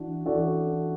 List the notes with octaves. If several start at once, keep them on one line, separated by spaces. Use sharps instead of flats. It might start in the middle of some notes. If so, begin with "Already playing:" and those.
Already playing: E3 D4 F#4
E3 D4 F#4 A4 D5